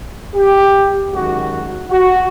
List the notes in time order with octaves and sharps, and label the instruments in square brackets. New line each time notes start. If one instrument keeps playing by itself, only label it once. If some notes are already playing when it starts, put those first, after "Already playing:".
[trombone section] G4
F#2 D#3 G#3 F#4
F#4